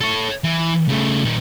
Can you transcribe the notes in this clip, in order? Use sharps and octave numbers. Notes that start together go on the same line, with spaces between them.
A4 C#5
E3
C#3 A3
A#2 D#3